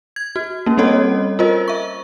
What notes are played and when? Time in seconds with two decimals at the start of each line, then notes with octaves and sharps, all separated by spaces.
0.16 G#6
0.36 F#4
0.66 A#3 C#4
0.77 G3 C4 C#4 A4 C#5 D#5
1.39 F4 A#4 C5 D#5
1.68 E5 C#6